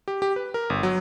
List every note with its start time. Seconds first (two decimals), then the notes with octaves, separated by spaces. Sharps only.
0.08 G4
0.22 G4
0.36 B4
0.54 A#4
0.70 G1
0.83 F#3